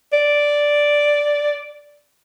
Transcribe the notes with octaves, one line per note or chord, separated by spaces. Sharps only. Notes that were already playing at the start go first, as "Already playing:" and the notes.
D5